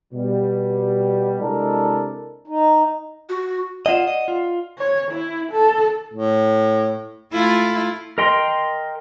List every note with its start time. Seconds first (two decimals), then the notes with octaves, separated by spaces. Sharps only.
0.13 B2 G3
1.40 C3 G#3 D4 E4 A4 A#4
2.48 D#4
3.29 F#4
3.86 F4 D5 D#5 F#5 E7
4.07 D#5
4.28 F4
4.78 C#5
5.11 E4
5.52 A4
6.14 A2
7.33 A3 E4 F4
8.18 A#4 D#5 G5 C6